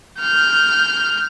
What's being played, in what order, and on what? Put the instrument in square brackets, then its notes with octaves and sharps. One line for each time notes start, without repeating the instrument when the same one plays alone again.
[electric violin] F6 G6